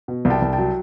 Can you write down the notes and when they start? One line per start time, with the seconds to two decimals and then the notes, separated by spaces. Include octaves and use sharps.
0.08 B2
0.25 C2
0.30 G5 A5
0.42 C2
0.53 G5 A5
0.58 F#3